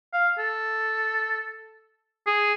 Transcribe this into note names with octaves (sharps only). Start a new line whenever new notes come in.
F5
A4
G#4